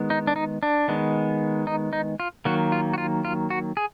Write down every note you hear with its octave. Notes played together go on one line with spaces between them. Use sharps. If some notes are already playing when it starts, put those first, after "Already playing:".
Already playing: D#3 G#3 B3
D#4
D4
D#4
D4
D#3 G#3 B3
D#4
D#4
F4
D#3 F#3 A#3 F#4
F4
F#4
F4
F4
F#4
G#4